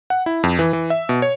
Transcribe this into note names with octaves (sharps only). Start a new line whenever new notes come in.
F#5
E4
F2
E3
E3
E5
B2
C#5